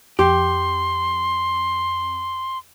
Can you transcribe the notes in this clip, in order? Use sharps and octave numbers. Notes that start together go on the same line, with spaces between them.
F2 G4 C6